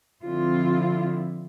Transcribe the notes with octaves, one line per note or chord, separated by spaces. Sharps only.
D3 F3 C4 E4 F4